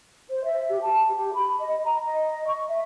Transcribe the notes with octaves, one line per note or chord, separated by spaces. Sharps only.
C5
E5
G4
A5
G4
B5
D#5
A#5
D#5
C#6
E5